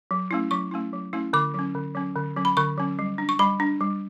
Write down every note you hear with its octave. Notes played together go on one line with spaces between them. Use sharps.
F#3
A3 C#4 E4
F#3 C#6
A3 C#4 E4
F#3
A3 C#4 E4
D3 D6
F#3 C#4
D3
F#3 C#4
D3
F#3 C#4
B5
D3 C#6
F#3 C#4
G3
D4
C#6
G3 B5
D4
G3